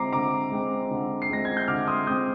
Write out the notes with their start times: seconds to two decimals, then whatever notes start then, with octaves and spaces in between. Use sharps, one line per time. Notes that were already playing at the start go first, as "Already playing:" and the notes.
Already playing: D3 G#3 C4 A#5 D6 C7
0.13 D3 A#5 D6
0.52 G#3 C4
0.91 D3
1.22 C7
1.30 G#3 C4 A#6
1.45 G#6
1.57 G6
1.68 D3 D6 F6
1.87 C6 D#6
2.07 G#3 C4 D#6 G6